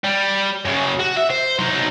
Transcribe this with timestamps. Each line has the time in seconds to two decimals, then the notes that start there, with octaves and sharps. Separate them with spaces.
0.04 G3
0.65 F#2 C#3
0.99 F#4
1.17 E5
1.30 C5
1.59 F#3 D#4